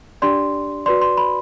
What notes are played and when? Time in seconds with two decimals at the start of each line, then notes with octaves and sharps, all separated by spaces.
0.22 D4 G4 D5 C6
0.86 F#4 B4 D5 C6
1.02 C6
1.17 B5